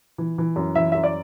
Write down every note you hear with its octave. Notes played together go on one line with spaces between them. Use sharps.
E3
E3
F#2
E3 E5
F#2 E5
D5